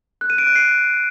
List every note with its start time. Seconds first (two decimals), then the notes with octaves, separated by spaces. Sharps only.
0.21 F#6
0.30 D#7
0.38 D7
0.47 F#6
0.56 C7